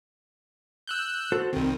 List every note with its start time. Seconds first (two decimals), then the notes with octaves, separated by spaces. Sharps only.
0.87 E6 F#6 G6
1.32 F#4 A4 C5
1.53 C2 D#3 C4